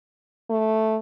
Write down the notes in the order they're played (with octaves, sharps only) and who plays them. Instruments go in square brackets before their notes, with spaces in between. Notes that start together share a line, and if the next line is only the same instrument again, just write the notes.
[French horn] A3